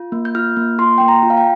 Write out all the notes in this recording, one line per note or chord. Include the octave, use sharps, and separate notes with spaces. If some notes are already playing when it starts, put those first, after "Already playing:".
Already playing: F4
A#3
G6
F4 F6
A#3
F4 C6
A#3 G5
A#5
F4
F5
G5